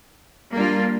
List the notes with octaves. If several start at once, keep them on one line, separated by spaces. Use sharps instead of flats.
G3 A#3 D4 F4